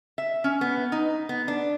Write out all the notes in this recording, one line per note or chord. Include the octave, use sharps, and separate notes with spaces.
E5
C#4
B3
D#4
B3
D4